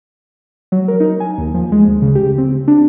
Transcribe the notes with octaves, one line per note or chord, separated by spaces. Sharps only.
F#3
A#4
D#4
G#5
D#2
F3
G#3
D2
C#3
G4
C4
D4